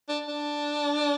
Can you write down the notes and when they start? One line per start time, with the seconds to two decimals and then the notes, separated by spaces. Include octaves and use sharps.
0.09 D4
0.28 D4